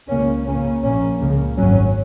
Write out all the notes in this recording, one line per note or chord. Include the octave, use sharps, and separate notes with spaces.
C#2 C#3 A#3 C#4
C#2 C#3 A#3 C#4
A#1 A#2 A#3 C#4
C#2 C#3 A#3
G#1 F#2 F#3 C#4